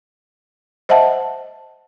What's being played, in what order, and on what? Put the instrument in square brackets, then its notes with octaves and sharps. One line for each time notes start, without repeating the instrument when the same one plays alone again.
[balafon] C5 D#5 E5 F#5 A5